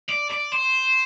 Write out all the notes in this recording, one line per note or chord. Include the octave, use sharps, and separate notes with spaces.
D5
D5
C5